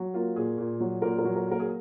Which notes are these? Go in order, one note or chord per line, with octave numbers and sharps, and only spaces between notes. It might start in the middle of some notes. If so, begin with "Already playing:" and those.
Already playing: F#3
A#3 F4
A#2 G#4
A#2
F#3
A#2 A#4
A#4
F#3
A#4
A#3 A#4
G#4